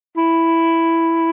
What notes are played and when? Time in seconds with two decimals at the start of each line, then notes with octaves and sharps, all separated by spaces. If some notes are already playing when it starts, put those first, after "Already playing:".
0.17 E4